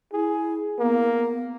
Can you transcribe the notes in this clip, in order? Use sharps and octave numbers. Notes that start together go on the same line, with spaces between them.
E4 G#4
A#3 B3